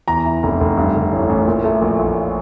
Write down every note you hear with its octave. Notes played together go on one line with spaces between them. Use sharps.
E2 A#5
E3
F1
F1
G2
D3
A1
A1
A#2
A3
A#1
A#1